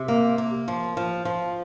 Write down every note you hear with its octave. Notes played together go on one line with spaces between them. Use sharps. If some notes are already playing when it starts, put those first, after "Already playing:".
Already playing: C3
A#3
A#3
F3
F3
F3